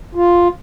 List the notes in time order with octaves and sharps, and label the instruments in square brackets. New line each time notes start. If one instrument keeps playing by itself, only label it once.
[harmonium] F4